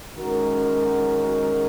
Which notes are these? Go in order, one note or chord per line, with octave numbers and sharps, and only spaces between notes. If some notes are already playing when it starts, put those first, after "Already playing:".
D#3 G#3 C#4 F#4 A#4